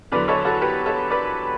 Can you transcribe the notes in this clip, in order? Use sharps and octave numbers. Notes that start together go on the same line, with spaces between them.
E2 D3 F#3 B4 D5
A4 C#5
F#4 A4
G4 B4
A4 C#5
B4 D5